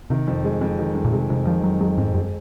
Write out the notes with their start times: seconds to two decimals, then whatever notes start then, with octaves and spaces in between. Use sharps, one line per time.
0.10 C3 D#3
0.28 F2
0.45 G#3
0.61 F2
0.79 D#3
0.95 F2
1.05 A#2
1.13 C3 G#3
1.30 F2 C3
1.46 D#3 F3
1.63 F2 F#3
1.81 F#3 G#3
1.98 F2 G#2
2.15 F#2 G#3